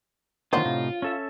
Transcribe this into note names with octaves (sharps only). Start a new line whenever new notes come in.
D#3 F#3 A#3 D4 D#4 F4 C5
A2 C3 D#4
C#4 A4 E5